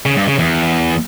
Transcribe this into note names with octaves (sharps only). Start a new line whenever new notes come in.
C#3
G2
C#3
E2